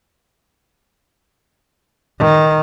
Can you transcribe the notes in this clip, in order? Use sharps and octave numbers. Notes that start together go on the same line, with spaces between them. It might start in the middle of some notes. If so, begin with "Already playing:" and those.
D#3